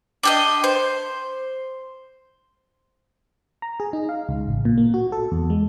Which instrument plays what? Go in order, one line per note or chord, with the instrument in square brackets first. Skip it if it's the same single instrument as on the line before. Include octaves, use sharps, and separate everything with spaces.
[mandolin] D4 G4 D#5
C5
[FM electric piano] A#5
G#4
D#4
F5
C#2
A1
A#2
A#3
F#4
A4
E2
G#3